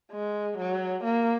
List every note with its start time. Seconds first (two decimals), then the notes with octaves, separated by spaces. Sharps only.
0.11 G#3
0.57 F#3
1.04 A#3